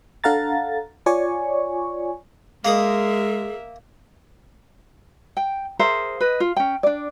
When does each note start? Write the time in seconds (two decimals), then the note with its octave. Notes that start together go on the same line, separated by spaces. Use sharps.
0.24 D4 A4 F5 F#5 A#5 A6
1.06 F4 C#5 D5 G#5 C#6
2.65 G#3 A#3 G#4 A#4 E5 D#6
5.37 G5
5.79 G#4 A#4 C5 E5
6.21 B4 D#5
6.40 F4
6.56 C#4 G5
6.83 D4 D5